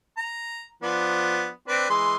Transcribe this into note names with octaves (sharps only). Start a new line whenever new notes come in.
A#5
F3 B3 D4
C4 D4 B4
E3 G#3 C6